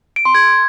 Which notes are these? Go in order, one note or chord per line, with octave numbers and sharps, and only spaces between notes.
D7
C6
G#6